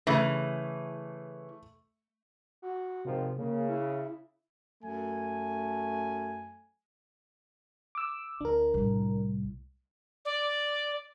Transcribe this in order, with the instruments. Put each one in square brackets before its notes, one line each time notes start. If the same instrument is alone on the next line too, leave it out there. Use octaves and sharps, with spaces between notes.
[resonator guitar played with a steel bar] C#3 E3 [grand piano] A3 E5
[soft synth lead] F#4
[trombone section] G#1 D#3 F3 [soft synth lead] C3
[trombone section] C#3 [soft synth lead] A#3
[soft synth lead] E4
[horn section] F#2 A3 G#5
[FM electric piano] D6 E6
[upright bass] D2 [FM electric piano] D4 A#4
[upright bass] C2 A2
[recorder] D5